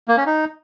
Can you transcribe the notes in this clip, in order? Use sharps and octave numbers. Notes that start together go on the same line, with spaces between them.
A#3
C#4
D#4